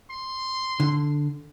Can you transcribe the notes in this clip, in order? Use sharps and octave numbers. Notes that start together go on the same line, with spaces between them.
C6
D3